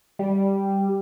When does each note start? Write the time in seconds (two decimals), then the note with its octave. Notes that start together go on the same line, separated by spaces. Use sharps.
0.19 G3